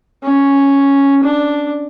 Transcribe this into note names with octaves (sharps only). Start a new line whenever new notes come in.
C#4
D4